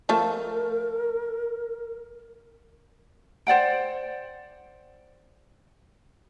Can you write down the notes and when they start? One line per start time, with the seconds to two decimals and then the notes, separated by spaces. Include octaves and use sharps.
0.09 F3 A3 A4 A#4
3.47 C5 D5 F#5 G5